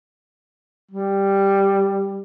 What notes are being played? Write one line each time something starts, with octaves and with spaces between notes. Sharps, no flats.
G3